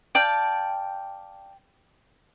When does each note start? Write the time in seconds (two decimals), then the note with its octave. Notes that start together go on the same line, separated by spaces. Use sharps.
0.15 D5 F5 G5 A5